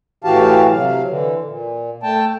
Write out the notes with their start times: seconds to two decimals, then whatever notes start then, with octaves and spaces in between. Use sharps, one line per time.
0.24 A2 E3 F#4 G4 F5 A5
0.72 C3 F#3 F5
1.07 D3 E3
1.44 A#2
2.03 A3 G5 A5